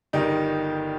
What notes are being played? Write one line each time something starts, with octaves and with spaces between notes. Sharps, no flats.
G1 G2 D#3 D#4 G4